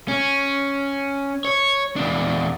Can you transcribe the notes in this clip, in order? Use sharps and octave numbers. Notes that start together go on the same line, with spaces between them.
C#4
C#5
E2 D4